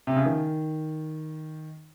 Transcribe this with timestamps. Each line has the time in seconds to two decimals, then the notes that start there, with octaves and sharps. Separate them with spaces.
0.07 C3
0.16 C#3
0.26 D#3